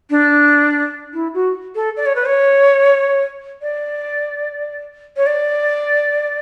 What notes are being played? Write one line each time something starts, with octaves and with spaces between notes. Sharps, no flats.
D4
E4
F#4
A4
D5
C#5
B4
C#5
D5
C#5
D5